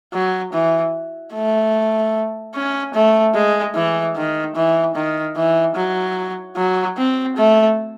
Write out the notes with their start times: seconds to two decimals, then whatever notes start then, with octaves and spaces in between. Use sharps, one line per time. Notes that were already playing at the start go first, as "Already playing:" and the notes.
0.14 F#3
0.53 E3
1.34 A3
2.55 C#4
2.94 A3
3.34 G#3
3.75 E3
4.16 D#3
4.56 E3
4.95 D#3
5.36 E3
5.76 F#3
6.57 F#3
6.97 C4
7.37 A3